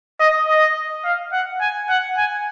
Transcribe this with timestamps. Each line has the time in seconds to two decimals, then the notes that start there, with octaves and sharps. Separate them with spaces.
0.20 D#5
0.48 D#5
1.04 F5
1.33 F#5
1.61 G#5
1.89 F#5
2.17 G#5